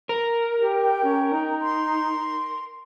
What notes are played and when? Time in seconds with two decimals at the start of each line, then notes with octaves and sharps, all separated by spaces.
0.09 A#4
0.59 G4
0.80 G5
1.04 C#4
1.33 D#4
1.61 C6